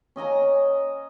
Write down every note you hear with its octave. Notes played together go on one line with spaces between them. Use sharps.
C#4 D#5 G#5 A#5